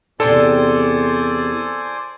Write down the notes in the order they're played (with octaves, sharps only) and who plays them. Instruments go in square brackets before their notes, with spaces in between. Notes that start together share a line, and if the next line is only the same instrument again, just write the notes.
[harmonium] E2 [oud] C3 D4 [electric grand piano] A4 [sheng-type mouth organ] C5 D5 G#5